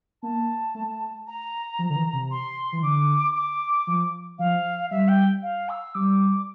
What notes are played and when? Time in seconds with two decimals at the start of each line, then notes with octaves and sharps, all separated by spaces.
0.23 A#3 A5
0.75 A3
1.27 A#5
1.79 F3
1.90 D3
1.96 E3
2.13 C3
2.31 C6
2.72 E3
2.83 D3 D6
3.35 D6
3.87 F3
4.39 F3 F5
4.91 G3 E5
5.08 G5
5.43 F5
5.69 E6
5.95 G3 D6